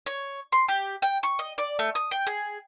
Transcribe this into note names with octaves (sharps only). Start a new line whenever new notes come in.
C#5
C6
G4
G5
C#6
D#5
D5
A3
D#6
G5
G#4